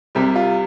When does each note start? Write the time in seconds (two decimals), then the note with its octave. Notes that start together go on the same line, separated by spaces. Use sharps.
0.15 C2 C3 G3 G4
0.35 F4